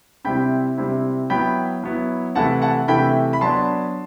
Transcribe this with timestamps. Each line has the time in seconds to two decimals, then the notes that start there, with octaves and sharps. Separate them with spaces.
0.25 C3 G3 C4 E4 G5 B5
0.77 C3 G3 C4 E4
1.30 F#3 B3 E4 G5 B5
1.83 F#3 B3 E4
2.35 C3 E3 A3 E4 F#5 A5
2.62 F#5 A5
2.88 C3 E3 A3 E4 G5 B5
3.33 B5
3.41 F#3 B3 D4 A5 C6